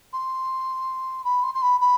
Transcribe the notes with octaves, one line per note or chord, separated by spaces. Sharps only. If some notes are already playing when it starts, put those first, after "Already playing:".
C6
B5
C6
C6
B5
B5